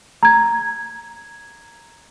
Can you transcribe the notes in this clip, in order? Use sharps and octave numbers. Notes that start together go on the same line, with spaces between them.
A#5 G#6